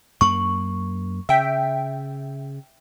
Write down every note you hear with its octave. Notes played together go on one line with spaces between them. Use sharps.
F#2 A#3 C#6
C#3 E5 G5